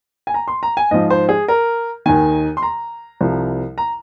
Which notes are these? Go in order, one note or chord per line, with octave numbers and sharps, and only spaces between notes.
G#5
A#5
C6
A#5
G#5
G#2 F3 D#5
C5
G#4
A#4
D#2 D#3 G#5
C6
A#5
C2 C3 F3
A#5